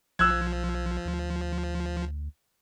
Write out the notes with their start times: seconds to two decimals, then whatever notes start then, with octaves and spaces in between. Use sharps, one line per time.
0.19 B1 F3 E6 F#6 G#6
1.05 D2